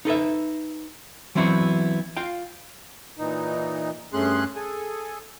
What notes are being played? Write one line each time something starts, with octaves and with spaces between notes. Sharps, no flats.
D#4 A4 B4 E5
E3 F#3 B3 C4 E4 F#4
F4 F5 G5
A#2 E3 D#4
G2 A3 C#4 G#4 C6 F#6
G#4 A4 G#5